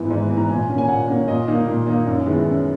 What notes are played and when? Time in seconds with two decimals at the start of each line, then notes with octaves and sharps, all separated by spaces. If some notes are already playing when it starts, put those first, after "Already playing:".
Already playing: G#2 E3 B3 E4
0.10 G#2
0.29 E3 B3 E4
0.37 A#5
0.49 A#2 G#5
0.69 A#3 C#4
0.78 G#5
0.88 A#2 F#5
1.08 A#3 C#4
1.27 A#2 D#5
1.47 A#3 D#4
1.67 A#2
1.87 A#3 D#4
2.07 F#2
2.26 D#3 G#3 B3 E4
2.45 F#2